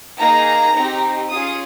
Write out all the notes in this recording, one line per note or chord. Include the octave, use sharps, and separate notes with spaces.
A#3 D#4 G#4 A#5
C4 D#4 G4
C#4 F4 G#4 D#6